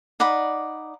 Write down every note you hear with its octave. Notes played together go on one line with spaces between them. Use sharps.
D#4 D5 F#5 B5